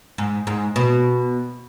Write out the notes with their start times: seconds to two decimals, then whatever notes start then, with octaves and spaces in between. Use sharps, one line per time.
0.18 G#2
0.47 G#2
0.76 B2